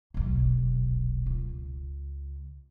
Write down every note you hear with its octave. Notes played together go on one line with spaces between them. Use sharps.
D#1 B1
C#2